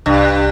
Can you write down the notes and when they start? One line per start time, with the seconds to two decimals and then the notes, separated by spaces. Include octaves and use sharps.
0.06 C2 G2